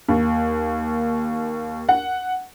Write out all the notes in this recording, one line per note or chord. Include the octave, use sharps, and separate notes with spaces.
D#2
F#5